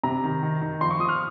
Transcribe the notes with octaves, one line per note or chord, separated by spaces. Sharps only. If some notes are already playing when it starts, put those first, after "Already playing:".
C3 A#5
D#3
D#3
D#3
F3 C6
C#6
F3 D#6
F6